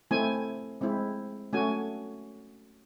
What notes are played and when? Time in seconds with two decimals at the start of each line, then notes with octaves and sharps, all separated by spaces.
0.11 A3 C4 E4 G#5
0.81 G#3 C4 E4
1.53 A3 C#4 F#4 G#5